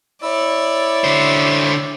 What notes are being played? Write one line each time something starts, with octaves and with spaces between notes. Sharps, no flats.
E4 C#5 D5 E6
D3 C5